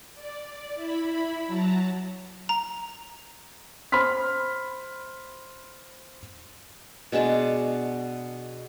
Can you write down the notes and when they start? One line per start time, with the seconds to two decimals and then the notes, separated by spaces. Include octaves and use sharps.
0.15 D5
0.75 E4 B5
1.47 F#3 A5 A#5
2.49 A#5
3.92 C5 B5 C6 F6 B6
7.12 B2 G#3 D4 A5